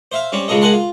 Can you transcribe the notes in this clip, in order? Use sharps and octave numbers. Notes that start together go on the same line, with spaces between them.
C5 E5 F5
G3 C4 C#4
C#2 C#3 G#3 A4 D#5
G#3 A#4 F#5 G#5 A5 C6
F4